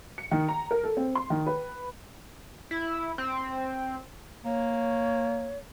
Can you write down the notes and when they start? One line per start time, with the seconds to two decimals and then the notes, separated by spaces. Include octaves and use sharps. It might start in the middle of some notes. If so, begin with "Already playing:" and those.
0.18 C#7
0.31 D#3
0.49 A#5
0.71 A#4
0.84 A4
0.97 C4
1.15 C6
1.30 D#3
1.47 B4
2.71 E4
3.18 C4
4.44 A#3 C#5